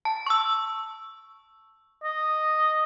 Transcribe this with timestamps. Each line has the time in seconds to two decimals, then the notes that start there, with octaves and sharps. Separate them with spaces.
0.05 A5
0.27 C#6 E6
2.04 D#5